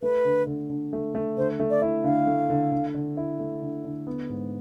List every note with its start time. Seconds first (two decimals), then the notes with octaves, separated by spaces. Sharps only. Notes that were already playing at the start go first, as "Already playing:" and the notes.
0.02 A3 B4
0.25 D3
0.47 D3
0.70 D3
0.93 A3
1.15 A3
1.37 D3 C5
1.60 A3
1.70 D5
1.82 E4
2.04 D3 F5
2.27 A3
2.50 D3
2.72 D3
2.94 D3
3.17 E4
3.39 A3
3.62 D3
3.84 D3
4.07 B3
4.29 G#2